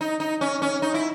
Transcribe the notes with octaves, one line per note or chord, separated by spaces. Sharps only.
D#4
D#4
C#4
C#4
D#4
E4